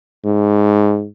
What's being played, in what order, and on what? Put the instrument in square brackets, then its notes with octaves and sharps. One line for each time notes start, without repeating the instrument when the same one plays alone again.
[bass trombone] G#2